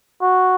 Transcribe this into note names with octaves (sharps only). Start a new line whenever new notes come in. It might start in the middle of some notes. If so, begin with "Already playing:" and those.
F#4